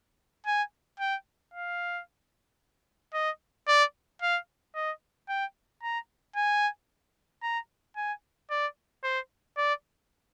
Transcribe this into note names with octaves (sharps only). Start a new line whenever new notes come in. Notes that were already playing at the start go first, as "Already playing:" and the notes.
G#5
G5
F5
D#5
D5
F5
D#5
G5
A#5
G#5
A#5
G#5
D5
C5
D5